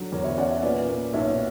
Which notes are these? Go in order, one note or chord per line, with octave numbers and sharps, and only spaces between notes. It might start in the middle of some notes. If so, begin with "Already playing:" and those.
Already playing: D3 F#3 F#4
E2 A#4 C#5
C#5 E5
C#4 D5 F#5
C#5 E5
A#2 B4 D5
A#3
B1 C#5 E5